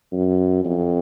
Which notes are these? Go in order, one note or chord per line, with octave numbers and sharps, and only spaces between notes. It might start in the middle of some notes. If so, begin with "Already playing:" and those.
F#2
F2